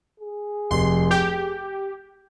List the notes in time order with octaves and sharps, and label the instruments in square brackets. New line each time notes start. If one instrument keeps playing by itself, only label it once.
[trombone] G#4
[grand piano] F1 [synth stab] C6
[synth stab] G4 [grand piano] G6